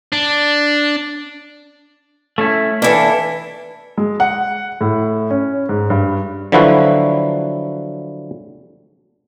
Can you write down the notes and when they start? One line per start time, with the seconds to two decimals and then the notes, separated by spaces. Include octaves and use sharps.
0.13 D4
2.38 A3 C#4 E4
2.82 E3 A#3 D4 E4 A4
3.98 G#3
4.20 F#5
4.81 A2
5.30 C#4
5.69 G#2
5.90 G2
6.52 D3 F3 F#3 E4 F#4 B4